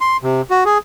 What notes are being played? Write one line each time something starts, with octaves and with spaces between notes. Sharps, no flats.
C6
C3
F#4
G#4